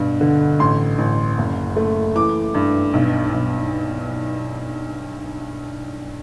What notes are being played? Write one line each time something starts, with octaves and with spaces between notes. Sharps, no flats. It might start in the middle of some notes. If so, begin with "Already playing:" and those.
Already playing: G2 B2
D3
A1 C6
A1
F#1
A3
E3 D6
G2
B1
B1